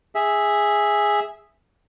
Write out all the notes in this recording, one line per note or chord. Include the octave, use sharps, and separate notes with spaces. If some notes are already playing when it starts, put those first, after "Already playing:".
G#4 E5